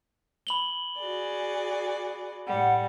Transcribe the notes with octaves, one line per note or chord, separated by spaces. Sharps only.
B5 F#7 G7
F#4 G#4 D5
A2 G3 F#5